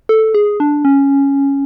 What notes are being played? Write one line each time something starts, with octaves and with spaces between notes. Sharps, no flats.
A4
G#4
D4
C#4